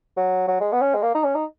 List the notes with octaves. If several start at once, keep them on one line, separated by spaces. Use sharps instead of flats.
F#3
F#3
G#3
B3
C#4
G#3
A#3
D#4
C#4
D#4